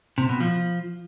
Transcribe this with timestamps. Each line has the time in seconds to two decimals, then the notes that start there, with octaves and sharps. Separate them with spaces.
0.18 C3
0.29 B2
0.40 F3